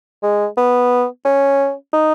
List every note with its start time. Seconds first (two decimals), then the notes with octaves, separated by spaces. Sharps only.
0.23 G#3
0.57 B3
1.25 C#4
1.93 D#4